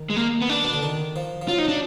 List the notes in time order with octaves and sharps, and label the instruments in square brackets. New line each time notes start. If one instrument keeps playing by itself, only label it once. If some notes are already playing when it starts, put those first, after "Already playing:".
Already playing: [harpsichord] D#3
[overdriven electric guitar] G#3
A#3
B3
D4
[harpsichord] B2
D3
D#3
F3
F3
[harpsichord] F#3 [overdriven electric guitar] F4
[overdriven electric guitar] D#4
D4